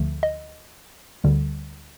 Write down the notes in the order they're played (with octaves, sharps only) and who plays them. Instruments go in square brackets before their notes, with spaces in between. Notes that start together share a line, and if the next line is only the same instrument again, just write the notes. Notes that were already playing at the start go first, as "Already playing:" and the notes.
Already playing: [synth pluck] D2 D3 F3 A3
D#5
D2 D3 G3